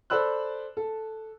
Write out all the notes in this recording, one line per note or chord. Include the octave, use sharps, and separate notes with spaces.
A4 C5 D5 B5 E6 F#6
A4